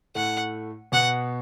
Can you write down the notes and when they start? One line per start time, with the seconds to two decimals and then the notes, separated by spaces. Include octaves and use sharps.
0.15 A2 A3 F#5
0.92 B2 B3 F#5